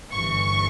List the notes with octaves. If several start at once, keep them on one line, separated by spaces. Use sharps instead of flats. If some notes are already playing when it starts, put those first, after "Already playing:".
G1 G2 E3 C#6